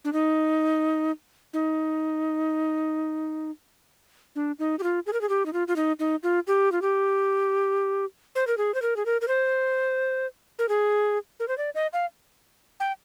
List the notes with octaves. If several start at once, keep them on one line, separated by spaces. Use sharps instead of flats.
D4
D#4
D#4
D4
D#4
G4
F4
G#4
A#4
G#4
G4
D#4
F4
F4
D#4
D#4
F4
G4
F4
G4
C5
A#4
G#4
C5
A#4
G#4
A#4
A#4
C5
A#4
G#4
A#4
C5
D5
D#5
F5
G5